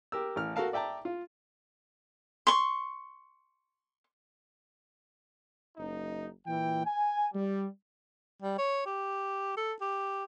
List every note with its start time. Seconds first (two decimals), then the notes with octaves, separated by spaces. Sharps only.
0.12 G4 A#4 E6
0.36 A1 F6
0.56 F#4 A4 A#4 F5 A5
0.73 D5 E5 G5 A5 A#5
1.05 F4
2.47 C6 C#6
5.76 F#1 D#4
6.47 A#2 E3 G5
6.85 G#5
7.33 G3
8.42 G3
8.59 C#5
8.86 G4
9.57 A4
9.81 G4